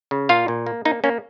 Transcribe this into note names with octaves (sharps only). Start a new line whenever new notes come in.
C#3
A#2 F4 F5
A#2
A#3
A#3 D#4
A#3 C#4